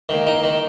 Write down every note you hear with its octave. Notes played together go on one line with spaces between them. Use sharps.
D#3 A#3
D#4
D#3